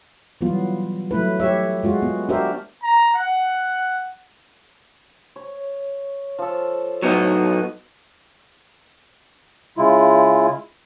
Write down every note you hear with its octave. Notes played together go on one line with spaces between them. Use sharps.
E3 F#3 G3 B3 F4
F#3 A3 E4 B4
G4 C#5 E5
G#3 F4 F#4
B3
D4 F#4 G4 A#4 C5 E5
A#5
F#5
C#5
F3 A4
A2 F#3 B3 D#4
C#3 G#3 E4 F4